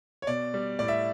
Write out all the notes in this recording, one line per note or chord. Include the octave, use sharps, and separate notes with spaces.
C#5
B2 D5
G3
A2 D5
E5